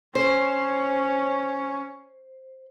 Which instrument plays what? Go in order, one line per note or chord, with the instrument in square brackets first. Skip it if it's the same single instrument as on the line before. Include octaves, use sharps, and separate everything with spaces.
[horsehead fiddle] C#4 C#5 [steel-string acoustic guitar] C5